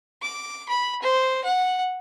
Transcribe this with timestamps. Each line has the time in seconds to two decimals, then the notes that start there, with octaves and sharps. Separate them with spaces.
0.22 D6
0.69 B5
1.02 C5
1.44 F#5